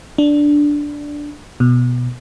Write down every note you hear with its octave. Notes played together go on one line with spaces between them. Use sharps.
D4
B2